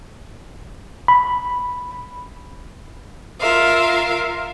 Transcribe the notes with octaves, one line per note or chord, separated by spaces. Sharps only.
B5
F4 A#4 E5 F5